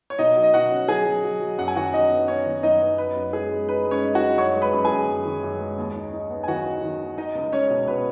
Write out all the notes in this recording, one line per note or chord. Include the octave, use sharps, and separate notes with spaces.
C#5
B2 D#4 D#5
F#3
D#5
B2 F#4 F#5
C#4
F#3 G#4 G#5
F#3
F#3
F#3
F#2 F#5
G#5
D#3 F#4 F#5
F#2 D#4 D#5
B3
B3 C#4 C#5
D#3
F#2 D#4 D#5
B3
D#4 B4
F#2
G#3 G#4
G#3
D#4 B4
G#3
C#4 C#5
D#4
F#4 F#5
D#4
F#2 C#5 C#6
G#3
B4 B5
F#2
G#4 G#5
F#2
F#2
D#3
F#2
G#3
D#2
D#4
D#4
B3
G#5
D#3 F#4 F#5
D#4
D#3
D#4
D#4 D#5
C#2
G#3 C#4 C#5
B2
B2 B4